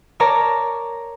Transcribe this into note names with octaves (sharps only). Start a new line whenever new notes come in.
A#4 C#5 D5 A5 A#5